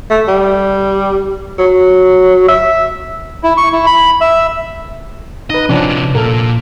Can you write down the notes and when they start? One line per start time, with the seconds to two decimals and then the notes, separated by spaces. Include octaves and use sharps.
0.10 A3
0.28 G3
1.59 F#3
2.48 E5
3.43 E4
3.57 C#6
3.73 E4
3.86 B5
4.21 E5
5.50 D#4 B4 D#5
5.69 C3 F3 B3 C#4 D4
6.15 A#2 A4 A#4